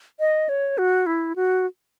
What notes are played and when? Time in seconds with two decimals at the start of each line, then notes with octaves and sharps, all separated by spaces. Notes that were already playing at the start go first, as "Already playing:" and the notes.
0.20 D#5
0.49 C#5
0.78 F#4
1.06 E4
1.36 F#4